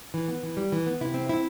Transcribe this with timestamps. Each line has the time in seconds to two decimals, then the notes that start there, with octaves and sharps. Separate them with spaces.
0.14 E3
0.28 B3
0.43 E3
0.57 G3
0.72 E3
0.87 B3
1.01 C3 E4
1.14 C4
1.29 E4